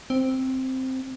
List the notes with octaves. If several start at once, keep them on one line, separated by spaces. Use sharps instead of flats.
C4